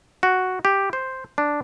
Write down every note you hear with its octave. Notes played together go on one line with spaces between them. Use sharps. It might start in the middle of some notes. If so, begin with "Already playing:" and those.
F#4
G4
C5
D4